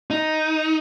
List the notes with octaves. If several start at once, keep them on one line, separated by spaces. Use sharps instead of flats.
D#4